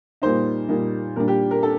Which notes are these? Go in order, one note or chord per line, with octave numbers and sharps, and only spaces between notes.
A#2 G3 A#3 D#4 C5
A#2 G3 A#3 D#4
A#2 G3 D4 A#4
G4
A#4
D4 A4